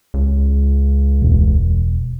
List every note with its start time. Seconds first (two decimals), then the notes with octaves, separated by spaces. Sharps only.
0.14 C#2
1.22 E1